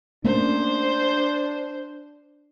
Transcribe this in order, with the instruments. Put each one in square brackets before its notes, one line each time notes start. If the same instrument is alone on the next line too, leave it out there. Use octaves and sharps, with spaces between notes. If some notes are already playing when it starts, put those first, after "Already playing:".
[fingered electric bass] A3 A#3 C#4 [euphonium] D4 [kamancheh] C5